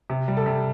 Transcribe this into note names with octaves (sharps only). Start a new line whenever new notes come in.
C3
G3
A4
C3